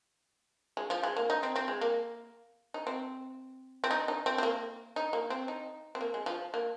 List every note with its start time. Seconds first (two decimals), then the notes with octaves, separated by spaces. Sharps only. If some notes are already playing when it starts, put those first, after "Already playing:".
0.77 G#3
0.90 F3
1.03 G#3
1.17 A#3
1.30 D#4
1.43 C4
1.56 C4
1.68 G#3
1.81 A#3
2.74 D#4
2.87 C4
3.84 C4
3.91 D#4
4.08 D#4
4.26 C4
4.38 C4
4.43 A#3
4.96 D#4
5.13 A#3
5.30 C4
5.48 D#4
5.95 C4
6.01 A#3
6.14 G#3
6.26 F3
6.54 A#3